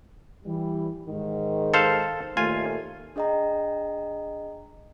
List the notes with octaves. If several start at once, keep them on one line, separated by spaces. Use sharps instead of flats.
E3 G3
G#2 D#3
A4 C5 F5
D#2 A#2 A3 F4 G#5
D4 G#4 D#5 G5 A#5